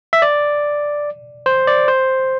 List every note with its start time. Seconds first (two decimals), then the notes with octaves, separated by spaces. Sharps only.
0.13 E5
0.22 D5
1.46 C5
1.67 D5
1.88 C5